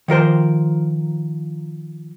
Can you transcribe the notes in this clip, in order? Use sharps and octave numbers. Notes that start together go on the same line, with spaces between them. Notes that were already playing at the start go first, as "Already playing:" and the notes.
D#3 F3 A#4 C5